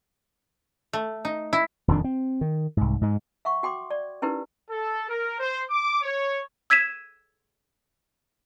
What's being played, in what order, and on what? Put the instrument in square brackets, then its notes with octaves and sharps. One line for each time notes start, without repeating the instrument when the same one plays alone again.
[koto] A3
D#4
E4
[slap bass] D#1 F2 D#3 D4
C4
D#3
C2 G#2
G#2 G#3
[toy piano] E5 F#5 C#6
F#4 G5 C6 D6
D5
C#4 D#4 E4 G4 A#4 B4
[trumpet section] A4
A#4
C5
D6
C#5
[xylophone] E6 G#6 B6 D#7 E7